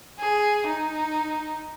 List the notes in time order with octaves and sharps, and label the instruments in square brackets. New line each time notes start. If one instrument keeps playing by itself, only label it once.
[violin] G#4
D#4